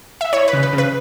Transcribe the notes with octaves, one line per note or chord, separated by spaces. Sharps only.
E5
E4 C#5
B4
C#3
B4
C#3
B4